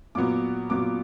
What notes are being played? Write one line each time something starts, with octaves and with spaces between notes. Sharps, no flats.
A#2 F#3 B3 D6
A#2 F#3 B3 D6